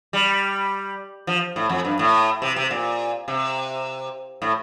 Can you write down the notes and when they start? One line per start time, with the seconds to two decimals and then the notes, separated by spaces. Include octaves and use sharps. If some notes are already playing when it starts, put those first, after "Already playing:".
0.13 G3
1.27 F3
1.56 A2
1.69 F2
1.85 G2
1.99 A2
2.42 C3
2.56 C3
2.71 A#2
3.28 C3
4.42 A2